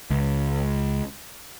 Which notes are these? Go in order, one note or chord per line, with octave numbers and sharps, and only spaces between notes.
C#2